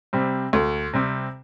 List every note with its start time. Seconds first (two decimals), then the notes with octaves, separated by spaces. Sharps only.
0.13 C3 G3 C4
0.53 D2
0.93 C3 G3 C4